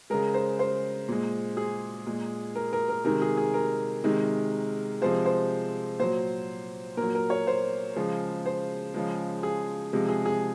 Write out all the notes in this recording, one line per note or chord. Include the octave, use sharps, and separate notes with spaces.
C#3 G#3 A#4
C5
C5
A#2 G#3
G#4
A#2 G#3
A#4
A#4
A#4
C3 D#3 G#3 A#4
G#4
G#4
A#4
C3 D#3 G#3
C3 F3 G#3 C5
C5
A#2 F#3 C5
A#2 F#3 A#4
A#4
C#5
C5
C#3 F3 G#3
C5
C#3 F3 G#3
G#4
C3 F3 G#3
G#4
G#4